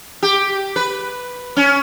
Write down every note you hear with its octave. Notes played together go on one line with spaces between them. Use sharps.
G4
B4
C#4